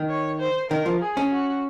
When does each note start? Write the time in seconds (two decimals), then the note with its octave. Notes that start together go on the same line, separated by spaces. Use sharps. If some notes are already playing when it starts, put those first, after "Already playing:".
Already playing: D#3
0.09 C#5
0.39 C5
0.70 D#3 A#4
0.86 F3
1.02 G#4
1.17 C#4
1.31 F#4